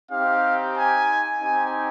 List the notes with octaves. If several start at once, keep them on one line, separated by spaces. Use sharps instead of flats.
C4 D#4 G4 F5
G#5
C4 D#4 G4 G#5